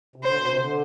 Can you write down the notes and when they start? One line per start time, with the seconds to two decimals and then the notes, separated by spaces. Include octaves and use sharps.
0.16 C3
0.24 D3 C5
0.36 B2
0.47 C3
0.58 D3